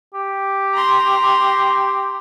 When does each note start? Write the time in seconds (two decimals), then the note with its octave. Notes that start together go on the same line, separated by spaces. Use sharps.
0.14 G4
0.74 A#5 C6